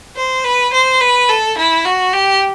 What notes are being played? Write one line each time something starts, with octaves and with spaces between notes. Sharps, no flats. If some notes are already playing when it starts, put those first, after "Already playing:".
C5
B4
C5
B4
A4
E4
F#4
G4